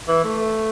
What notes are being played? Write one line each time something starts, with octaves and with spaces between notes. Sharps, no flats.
E3
A3